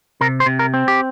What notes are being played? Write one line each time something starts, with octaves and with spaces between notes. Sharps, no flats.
C3 A#4
C5
C3
A#4
C4
G4